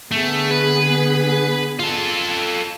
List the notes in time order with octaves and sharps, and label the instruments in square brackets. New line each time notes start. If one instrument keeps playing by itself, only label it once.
[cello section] D3 B3 G#4 [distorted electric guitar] A3
[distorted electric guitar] B4
F4 A4